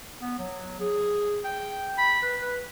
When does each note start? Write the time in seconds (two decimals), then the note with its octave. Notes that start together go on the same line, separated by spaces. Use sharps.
0.22 B3
0.39 F#3
0.80 G#4
1.44 G5
1.98 B5
2.23 B4
2.42 B4